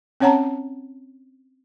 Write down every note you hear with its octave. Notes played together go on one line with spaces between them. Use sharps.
C4 C#4 C#5 F#5 A5 A#5